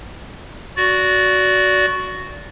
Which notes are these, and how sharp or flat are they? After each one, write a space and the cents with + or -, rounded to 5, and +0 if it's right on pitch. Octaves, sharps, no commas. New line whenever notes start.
F#4 +0 D5 -20